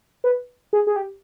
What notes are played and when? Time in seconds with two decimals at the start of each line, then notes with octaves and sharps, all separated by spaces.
0.24 B4
0.73 G#4
0.87 G#4
0.96 G4